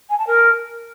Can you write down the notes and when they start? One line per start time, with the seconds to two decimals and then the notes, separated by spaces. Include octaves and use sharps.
0.09 G#5
0.18 A5
0.27 A#4